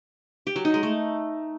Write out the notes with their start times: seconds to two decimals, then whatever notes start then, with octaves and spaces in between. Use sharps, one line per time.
0.47 G4
0.56 F#3
0.65 D#4
0.74 G#3
0.83 A3